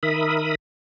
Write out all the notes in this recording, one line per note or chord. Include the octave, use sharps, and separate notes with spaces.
D#3 A#4 E5 B5 D#6